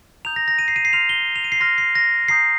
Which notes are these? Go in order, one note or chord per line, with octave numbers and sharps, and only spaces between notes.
A#5 D#6 G6 F7
A#6
A#6
D#7
C7
D#7
C7
C6 F6 F7
G7
F7
D#7
C7
C6 F6 A#6
C7
A#6
A#5 D#6 G6 C7